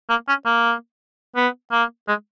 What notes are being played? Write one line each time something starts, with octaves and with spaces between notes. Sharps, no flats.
A#3
C#4
A#3
B3
A#3
G#3